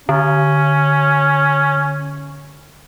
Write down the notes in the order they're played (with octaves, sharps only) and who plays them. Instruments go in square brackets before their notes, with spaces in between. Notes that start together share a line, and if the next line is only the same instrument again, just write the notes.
[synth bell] D3 [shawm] C#4